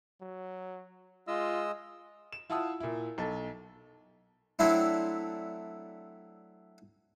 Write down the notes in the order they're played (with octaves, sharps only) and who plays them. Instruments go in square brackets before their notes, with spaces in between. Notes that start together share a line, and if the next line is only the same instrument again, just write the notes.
[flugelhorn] F#3
[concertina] G#3 D#5 E6 [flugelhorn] F4
[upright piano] E7
E4 F4 F#5 A5 D#6 E6
A#2 E4
B1 A4
[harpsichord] F#3 A3 C4 D4 E4